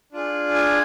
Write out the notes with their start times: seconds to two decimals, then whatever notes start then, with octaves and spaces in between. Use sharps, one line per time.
0.12 D4 F4 G#4
0.54 G#5